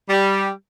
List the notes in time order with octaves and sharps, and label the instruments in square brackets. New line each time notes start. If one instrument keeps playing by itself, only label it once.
[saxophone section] G3